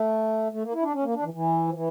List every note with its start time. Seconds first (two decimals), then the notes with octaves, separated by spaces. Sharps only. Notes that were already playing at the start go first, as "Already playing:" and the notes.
Already playing: A3
0.52 A3
0.63 A#3
0.73 E4
0.82 D4
0.93 C#4
1.04 A#3
1.14 D4
1.23 E3
1.34 E3
1.68 F3
1.74 E3